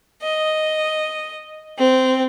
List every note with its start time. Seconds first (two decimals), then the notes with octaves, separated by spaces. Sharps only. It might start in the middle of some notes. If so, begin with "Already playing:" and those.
0.23 D#5
1.79 C4